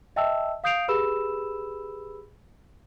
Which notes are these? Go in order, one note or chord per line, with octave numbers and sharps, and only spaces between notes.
D#5 E5 G5 A5 E6
F5 D#6 G6 C7 D7 F7
G4 G#4 B4 B5 E6 E7